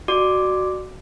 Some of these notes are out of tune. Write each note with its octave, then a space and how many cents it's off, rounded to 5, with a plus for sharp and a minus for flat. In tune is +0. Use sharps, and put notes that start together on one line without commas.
F#4 +10 D5 +30 D6 +0